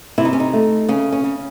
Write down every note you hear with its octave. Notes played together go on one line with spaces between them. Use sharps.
C3 E4
D#4
C#4
D#4
A3
C#3 C#4
C#4
C#3